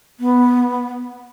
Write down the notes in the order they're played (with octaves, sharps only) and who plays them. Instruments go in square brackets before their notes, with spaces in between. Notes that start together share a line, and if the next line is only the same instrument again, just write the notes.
[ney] B3